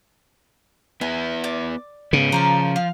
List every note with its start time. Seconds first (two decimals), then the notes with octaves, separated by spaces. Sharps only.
1.01 B3 E4 G#5
1.44 D5 D6
2.13 G#2 C#3 B3
2.32 F3 A#4 D5 A#5
2.76 F5